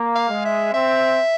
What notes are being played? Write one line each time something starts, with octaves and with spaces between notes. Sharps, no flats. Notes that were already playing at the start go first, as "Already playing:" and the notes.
Already playing: A#3
F5
G#3
E5
C4 E5